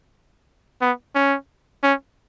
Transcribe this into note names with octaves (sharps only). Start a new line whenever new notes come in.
B3
C#4
C#4